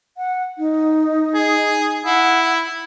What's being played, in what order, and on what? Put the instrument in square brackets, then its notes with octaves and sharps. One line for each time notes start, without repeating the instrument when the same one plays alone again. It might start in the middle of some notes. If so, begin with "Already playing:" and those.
[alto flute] F#5
D#4
[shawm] G#4
[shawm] E4 [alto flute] F#5